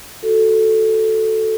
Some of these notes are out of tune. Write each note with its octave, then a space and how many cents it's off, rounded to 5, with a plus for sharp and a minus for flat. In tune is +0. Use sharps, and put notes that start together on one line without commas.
F#4 +0 A4 +0